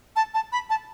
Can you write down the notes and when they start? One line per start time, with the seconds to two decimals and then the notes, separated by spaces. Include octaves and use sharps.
0.16 A5
0.34 A5
0.52 B5
0.70 A5